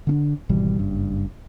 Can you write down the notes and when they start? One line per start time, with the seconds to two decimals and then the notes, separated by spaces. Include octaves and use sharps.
0.07 D3 C#4 D4
0.49 G#1 B2 E3 G3
0.79 F#1 G2